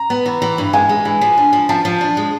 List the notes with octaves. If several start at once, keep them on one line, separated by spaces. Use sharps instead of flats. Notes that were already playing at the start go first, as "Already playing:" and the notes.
Already playing: A#5
B3
E3
E3
G2
G#3 G#5
G#3
E3
F3
D4
F3
F3 A5
F3
D4
G#3